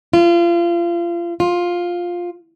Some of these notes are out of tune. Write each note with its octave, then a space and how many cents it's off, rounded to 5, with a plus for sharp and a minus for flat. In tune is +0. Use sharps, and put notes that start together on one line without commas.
F4 -30
F4 +10